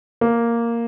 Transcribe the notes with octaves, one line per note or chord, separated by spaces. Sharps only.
A#3